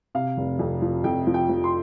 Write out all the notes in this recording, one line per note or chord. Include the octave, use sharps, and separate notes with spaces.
C3 F5
F1
F2
F3
F2 G5
F3
G5
F3
C6